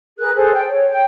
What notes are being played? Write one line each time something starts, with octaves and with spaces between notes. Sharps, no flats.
G#4 A#4 B4 F#6
G#4 A4 C5
G5
C#5
G5